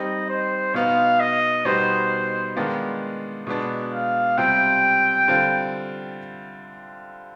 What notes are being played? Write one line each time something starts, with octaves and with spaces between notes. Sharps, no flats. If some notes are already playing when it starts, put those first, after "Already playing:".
Already playing: G3 C4 D#4 D#5
C5
B2 B3 D#4 F5
D#5
B2 G3 B3 D#4 C5
D#3 G#3 B3 D4 F4
B2 G#3 B3 D4
F5
C3 G3 C4 F4 G5
D3 G3 C4 F4